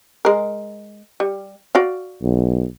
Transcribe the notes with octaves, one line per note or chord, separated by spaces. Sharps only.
G#3 A#4
G3
F#4 D5 F5
B1